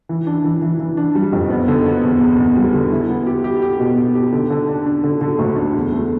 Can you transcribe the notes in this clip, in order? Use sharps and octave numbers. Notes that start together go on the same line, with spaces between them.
E3
D4
E3
E3
E3
D4
G3
F2
B3
D3
B3
E2
E2
E2
G3
D3
E4
B3
G4
G4
G4
B2
G4
G4
D3
D3
D4
D4
D3
D3
D2
D4
E2
A3